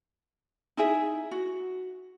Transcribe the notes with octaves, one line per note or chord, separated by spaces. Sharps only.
D#4 E4 G#4 E5
F#4